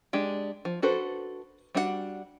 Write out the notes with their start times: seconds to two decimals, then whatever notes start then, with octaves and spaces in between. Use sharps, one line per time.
0.13 G#3 D4 G4
0.65 F3
0.82 D4 F#4 A4 B4 C5
1.75 G3 D4 F#4 G#4 F#5